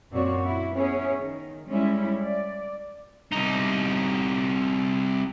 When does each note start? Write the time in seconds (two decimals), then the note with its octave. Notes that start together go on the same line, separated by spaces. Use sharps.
0.11 F#2 A#2 C4 F#4 C#5 D5
0.44 E4 F#4
0.74 B3 C#4 E4 G#4 C#5
1.17 D#3
1.66 G3 G#3 C#4 E4
2.23 D5
3.32 C2 D#4